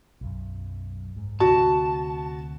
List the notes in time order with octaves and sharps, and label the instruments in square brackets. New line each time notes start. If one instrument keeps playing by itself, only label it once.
[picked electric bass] B1 F#2
G#2
[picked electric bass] D2 C3 [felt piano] F#4 [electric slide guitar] A5